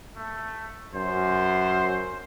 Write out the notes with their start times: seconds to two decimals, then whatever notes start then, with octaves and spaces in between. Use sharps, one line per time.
0.16 A3
0.94 F#2 C5